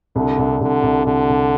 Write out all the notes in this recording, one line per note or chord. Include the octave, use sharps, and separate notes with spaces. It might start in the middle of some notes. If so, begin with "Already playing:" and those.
C2 D3
C2
C2 D3
C2
C2 D3
C2